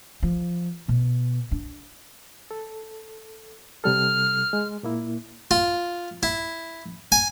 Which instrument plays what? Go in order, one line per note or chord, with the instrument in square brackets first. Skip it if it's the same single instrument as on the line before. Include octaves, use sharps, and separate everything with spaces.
[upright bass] F3
B2
D4
[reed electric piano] A4
[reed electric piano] C3 G3 A4 [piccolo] F6
[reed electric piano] G#3
A#2 A#3 E4
[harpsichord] F4
E4
G#5